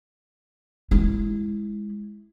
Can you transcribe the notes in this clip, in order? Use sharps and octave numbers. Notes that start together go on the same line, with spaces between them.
G#3 E4